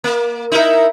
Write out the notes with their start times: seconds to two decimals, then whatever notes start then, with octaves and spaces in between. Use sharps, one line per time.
0.04 A#3
0.52 D#4 E4 A#4